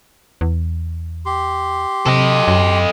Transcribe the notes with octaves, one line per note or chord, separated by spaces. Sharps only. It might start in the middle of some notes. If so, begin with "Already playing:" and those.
E2
G4 C6
C3 A4 D#5
F#2